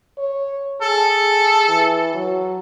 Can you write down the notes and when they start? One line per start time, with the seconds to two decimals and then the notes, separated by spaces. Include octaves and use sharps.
0.18 C#5
0.82 G#4 A4
1.68 E3
2.14 F#3